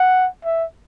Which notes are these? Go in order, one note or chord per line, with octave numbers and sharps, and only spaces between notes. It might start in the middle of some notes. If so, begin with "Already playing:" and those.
Already playing: F#5
E5